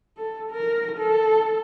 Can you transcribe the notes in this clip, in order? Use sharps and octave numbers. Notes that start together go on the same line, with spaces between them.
A4
A#4
A4